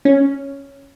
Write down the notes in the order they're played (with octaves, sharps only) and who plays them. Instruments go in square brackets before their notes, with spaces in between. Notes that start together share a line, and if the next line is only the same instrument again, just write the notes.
[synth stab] C#4